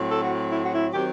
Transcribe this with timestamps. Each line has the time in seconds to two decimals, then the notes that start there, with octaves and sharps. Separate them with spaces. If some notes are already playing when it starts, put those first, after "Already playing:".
Already playing: A2 F#3 C4
0.08 A4
0.21 F#4
0.50 E4
0.63 F#4
0.71 E4
0.92 D#3 F#3 C4 G4